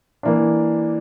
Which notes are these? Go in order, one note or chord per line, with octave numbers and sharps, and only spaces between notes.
E3 A#3 D4